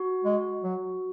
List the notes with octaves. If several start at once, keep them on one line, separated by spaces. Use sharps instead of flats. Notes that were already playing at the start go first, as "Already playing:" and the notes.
Already playing: F#4
G#3
F#3